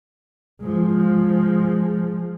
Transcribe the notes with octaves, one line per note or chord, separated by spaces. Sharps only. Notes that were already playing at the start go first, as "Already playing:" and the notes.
F3 G#3